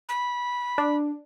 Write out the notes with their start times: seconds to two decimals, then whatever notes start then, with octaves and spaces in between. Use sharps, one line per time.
0.09 B5
0.78 D4